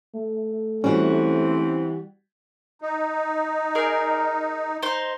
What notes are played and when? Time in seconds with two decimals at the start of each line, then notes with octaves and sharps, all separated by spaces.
0.15 A3
0.84 E3 G3 C4 C#4 F#4
2.82 D#4
3.75 G#4 A#4 D5
4.82 D#4 C5